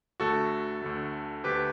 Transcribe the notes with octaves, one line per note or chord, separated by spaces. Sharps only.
D2 D3 A3 F#4 A4
D2 D3 A3
D2 D3 A3 G4 B4